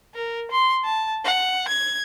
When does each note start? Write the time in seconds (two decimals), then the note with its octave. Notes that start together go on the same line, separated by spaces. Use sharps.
0.14 A#4
0.52 C6
0.84 A5
1.24 F#5
1.68 G#6